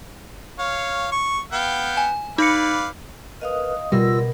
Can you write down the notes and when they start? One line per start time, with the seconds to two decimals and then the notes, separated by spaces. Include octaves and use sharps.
0.59 C#5 F5
1.12 C#6
1.53 B3 F5 G5
1.97 G#5
2.38 D#4 B4 D5 F5 C#7
3.41 A#4 B4 D#5 F5 D#6
3.92 B2 G3 F4 A#4 E6 A#6